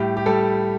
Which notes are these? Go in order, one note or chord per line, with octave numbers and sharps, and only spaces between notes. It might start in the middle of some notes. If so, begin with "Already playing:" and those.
Already playing: A2 G3 G4
G4
G3 A4